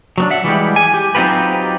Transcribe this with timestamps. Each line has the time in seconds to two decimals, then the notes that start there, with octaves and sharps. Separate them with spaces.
0.18 F#3 B3 D4
0.31 E5 F#5
0.44 E3 G3 G#3 G4
0.76 G#5
0.94 G4
1.15 F#3 C4 D#4 F4 G4 B4